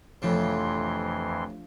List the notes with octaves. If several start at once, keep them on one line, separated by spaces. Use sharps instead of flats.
F2 A2 C3 E3 F3 D4 C6